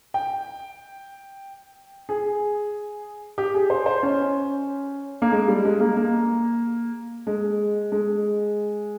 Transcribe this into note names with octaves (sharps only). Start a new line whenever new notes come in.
G5
G#4
G4
G#4
C5
C5
C#4
A#3
G#3
G3
G#3
A#3
A#3
G#3
G#3